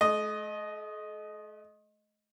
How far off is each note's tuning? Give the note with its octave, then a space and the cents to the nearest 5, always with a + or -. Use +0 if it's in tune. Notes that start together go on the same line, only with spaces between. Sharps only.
A3 -45 D#5 +0